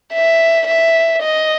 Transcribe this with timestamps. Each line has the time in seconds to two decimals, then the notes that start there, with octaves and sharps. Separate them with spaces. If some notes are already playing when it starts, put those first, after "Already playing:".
0.13 E5
0.67 E5
1.22 D#5